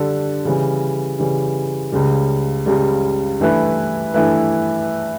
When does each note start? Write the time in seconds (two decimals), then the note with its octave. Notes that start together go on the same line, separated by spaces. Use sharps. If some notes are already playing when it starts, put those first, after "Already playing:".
Already playing: D3 G3 D4 A4
0.45 C#3 E3 G3
1.19 C#3 E3 G3
1.92 C#2 C#3 G3
2.66 C#2 C#3 G3
3.40 G2 E3 A3 E4 B4
4.14 G2 E3 A3 E4 B4